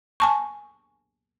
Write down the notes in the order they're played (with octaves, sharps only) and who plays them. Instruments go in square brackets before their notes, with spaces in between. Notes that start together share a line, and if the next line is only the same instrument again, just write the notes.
[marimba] G#5 A5 C#6